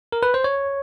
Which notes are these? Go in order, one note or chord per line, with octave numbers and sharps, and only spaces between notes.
A#4
B4
C5
C#5